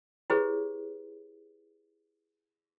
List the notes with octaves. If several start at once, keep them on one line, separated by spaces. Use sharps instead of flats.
E4 G4 G#4 B4 C#5